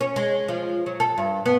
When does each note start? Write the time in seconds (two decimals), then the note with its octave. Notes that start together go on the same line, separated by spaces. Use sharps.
0.01 C#4
0.16 G#3
0.48 F3
0.86 F#3
1.00 A4
1.18 G2
1.46 B3